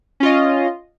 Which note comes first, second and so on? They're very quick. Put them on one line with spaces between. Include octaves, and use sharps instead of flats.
C#4 F4 D#5